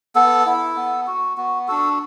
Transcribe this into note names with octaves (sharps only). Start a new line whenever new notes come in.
B3 A4
E4
B3
F#4
B3 F#4
D4 F#4 A4